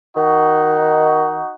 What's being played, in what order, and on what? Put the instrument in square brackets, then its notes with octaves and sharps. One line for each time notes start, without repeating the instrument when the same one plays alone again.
[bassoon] D#3 [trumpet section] D#4 F#4